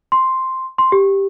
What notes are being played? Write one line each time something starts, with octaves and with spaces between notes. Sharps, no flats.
C6
C6
G4